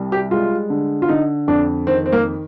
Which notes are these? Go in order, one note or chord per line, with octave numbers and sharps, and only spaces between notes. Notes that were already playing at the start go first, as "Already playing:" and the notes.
Already playing: C2 G3
G4
G#3 F4
D3
F4
D3 D#4
F2 D4
D#3 C4
C4
A#3